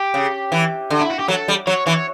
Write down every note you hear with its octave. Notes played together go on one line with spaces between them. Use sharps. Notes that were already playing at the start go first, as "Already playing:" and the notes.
Already playing: G4
C#3
E3
D3
E4
F#4
G4
F#3 A4
G3
F#3 C#5
E3 C#5